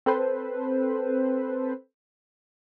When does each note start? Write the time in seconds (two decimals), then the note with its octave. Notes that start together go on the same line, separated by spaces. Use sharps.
0.06 C4 A4 B4 C5